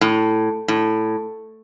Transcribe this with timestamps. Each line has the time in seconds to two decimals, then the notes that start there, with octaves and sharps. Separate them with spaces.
0.01 A2
0.68 A2